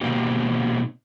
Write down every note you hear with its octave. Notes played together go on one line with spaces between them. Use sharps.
B2 A#3 C4 D#4 G4